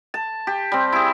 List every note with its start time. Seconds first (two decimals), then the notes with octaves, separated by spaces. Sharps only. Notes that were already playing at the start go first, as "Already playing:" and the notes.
0.14 A5
0.47 G4
0.72 G3 C4
0.92 E4 G#4